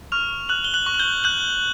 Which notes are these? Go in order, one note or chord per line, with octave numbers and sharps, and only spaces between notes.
C#6 F6 F7
F6 F#6 F#7
G7
F#6 F#7
C#6
F#7
G6 G7
F#6 G6 F#7